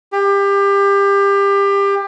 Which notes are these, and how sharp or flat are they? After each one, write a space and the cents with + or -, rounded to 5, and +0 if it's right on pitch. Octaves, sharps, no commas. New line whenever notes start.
G4 +25